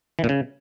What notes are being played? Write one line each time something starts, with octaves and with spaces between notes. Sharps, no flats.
E3
A#2
C#3